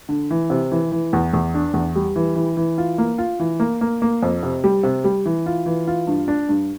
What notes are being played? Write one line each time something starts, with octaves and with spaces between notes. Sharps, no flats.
D3
E3
C3
E3
E3
E2
E2
D4
E2
G3
E3
E3
E3
F4
A#3
F4
E3
A#3
A#3
A#3
F2
C3
G3
C3
G3
E3
F4
E3
F4
G2
D4
G2